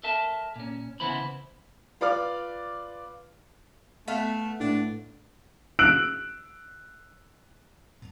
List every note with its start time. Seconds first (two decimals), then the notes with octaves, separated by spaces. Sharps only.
0.03 A4 A#4 E5 A5
0.56 A#2 C#4
1.00 C#3 E3 B3 E4 C5 B5
2.01 F4 B4 D5 D6 F6
4.08 A3 B3 E5 F5
4.60 A2 D4
5.79 E6 F#6 D7 F#7